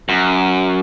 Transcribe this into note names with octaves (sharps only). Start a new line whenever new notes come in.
F#2